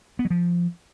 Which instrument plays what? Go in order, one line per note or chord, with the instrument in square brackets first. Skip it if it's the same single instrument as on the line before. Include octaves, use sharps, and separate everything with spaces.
[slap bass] B3
F#3
F3